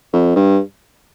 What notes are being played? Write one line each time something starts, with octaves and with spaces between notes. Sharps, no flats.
F2
G2